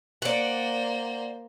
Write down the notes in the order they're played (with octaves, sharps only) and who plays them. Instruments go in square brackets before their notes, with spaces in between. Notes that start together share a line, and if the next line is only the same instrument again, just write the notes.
[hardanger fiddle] A#3 C5 [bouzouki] D5 F#5